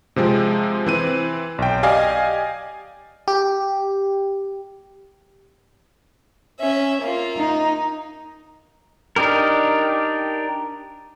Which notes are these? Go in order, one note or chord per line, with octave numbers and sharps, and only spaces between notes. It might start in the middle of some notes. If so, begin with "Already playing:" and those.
C3 F3 G#3 C4
E3 C4 D#7
B1 G5
G4 D5 D#5 F5 G#5
G4
C#4 E5
A#3 F4
D#4
D4 D#4 G4 A#4